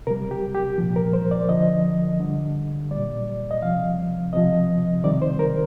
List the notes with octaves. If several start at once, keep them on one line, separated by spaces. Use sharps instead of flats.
C3 G3 A#4
G4
G4
A#2 F3
A#4
C5
D5
D3 F3 D#5
D3 G3
A#2 G3 D5
D#5
C3 F3 F5
C3 F3 D#5
C3 D#3 G3 D5
C5
A#4